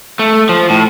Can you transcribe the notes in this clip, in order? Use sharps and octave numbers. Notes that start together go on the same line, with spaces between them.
A3
F3
A2